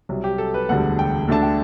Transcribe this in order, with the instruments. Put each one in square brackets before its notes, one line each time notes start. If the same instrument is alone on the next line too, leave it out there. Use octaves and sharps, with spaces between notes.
[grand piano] C2 C3 F#3
G4
A4
B4
E1 D2 D3 G3 F#5
G5
D2 D3 A3 D4 A5
G5